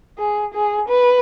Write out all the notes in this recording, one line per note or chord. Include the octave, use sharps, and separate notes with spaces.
G#4
G#4
B4